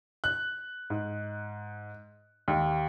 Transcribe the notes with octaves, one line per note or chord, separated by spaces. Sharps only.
F#6
G#2
D#2